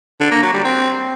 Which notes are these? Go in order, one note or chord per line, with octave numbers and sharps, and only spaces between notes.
D3
A#3
F#3
G3
C4